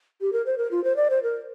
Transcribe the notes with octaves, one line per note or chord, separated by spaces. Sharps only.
G4
A#4
C5
A#4
F4
C5
D5
C5
A#4